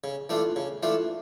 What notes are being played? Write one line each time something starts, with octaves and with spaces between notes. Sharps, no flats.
C#3
E3 A3 D4 F4
C#3
E3 A3 D4 F4